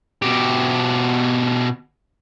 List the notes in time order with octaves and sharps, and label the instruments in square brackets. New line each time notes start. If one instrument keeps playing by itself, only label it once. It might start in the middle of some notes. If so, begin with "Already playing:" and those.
[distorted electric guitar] B2 G4